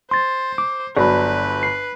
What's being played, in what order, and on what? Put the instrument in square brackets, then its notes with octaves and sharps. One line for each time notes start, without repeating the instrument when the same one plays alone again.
[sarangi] C5 [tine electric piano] C6 A6
[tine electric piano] D6
[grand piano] G1 F#3 [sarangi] B4 [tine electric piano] D5 B5
[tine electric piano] C7